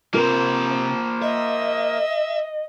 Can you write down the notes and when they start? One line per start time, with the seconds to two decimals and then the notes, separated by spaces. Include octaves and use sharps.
0.14 C3 A#3 F4 A#4 C5
1.22 D#5 E5